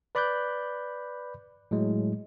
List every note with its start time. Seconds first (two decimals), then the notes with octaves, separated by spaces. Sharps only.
0.15 B4 D5 B5 D6 F#6 G6
1.71 A2 F#3 G#3